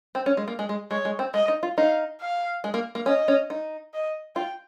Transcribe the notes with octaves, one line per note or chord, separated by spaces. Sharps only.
C4
C#4
G#3
A#3
G#3
G#3
G#3 C#5
G#3
C4
G#3 D#5
D#4
F4
D#4 F5
F5
G#3
A#3
A#3
C#4 D#5
C#4
D#4
D#5
F4 G5